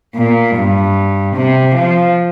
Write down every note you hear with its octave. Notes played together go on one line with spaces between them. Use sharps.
A#2
G2
C3
F3